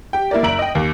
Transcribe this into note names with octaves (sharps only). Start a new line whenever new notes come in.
G4 G5
A#3 E4 A#4 D5
F#1 E5 A#5 D7 F#7
D#5 G5
D#2